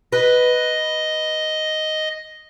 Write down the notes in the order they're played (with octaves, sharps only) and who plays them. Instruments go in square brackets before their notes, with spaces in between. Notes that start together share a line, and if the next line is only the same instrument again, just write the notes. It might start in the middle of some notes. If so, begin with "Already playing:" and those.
[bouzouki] B4 [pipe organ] D#5